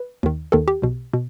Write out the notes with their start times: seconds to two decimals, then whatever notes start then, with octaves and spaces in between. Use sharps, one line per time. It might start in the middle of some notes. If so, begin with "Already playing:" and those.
Already playing: B4
0.23 D#2 D#3
0.52 D#2 D#3 A4
0.68 G4
0.82 B1 B2
1.14 B2